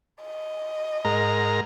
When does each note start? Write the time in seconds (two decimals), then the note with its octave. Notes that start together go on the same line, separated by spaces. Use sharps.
0.22 D#5
1.05 G#2 A#4 A#5